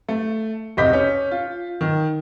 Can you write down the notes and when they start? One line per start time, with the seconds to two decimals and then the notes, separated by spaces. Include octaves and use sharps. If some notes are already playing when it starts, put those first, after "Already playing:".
0.09 A3
0.77 F1 C2 D#5 D6 G6 B6
0.93 C#4
1.31 F4
1.81 D#3